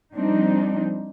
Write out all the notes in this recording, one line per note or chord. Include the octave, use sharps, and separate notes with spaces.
F3 G3 C4 D4 D#4